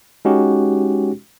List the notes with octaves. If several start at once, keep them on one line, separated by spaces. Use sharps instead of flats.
G#3 C#4 D#4 F#4 G4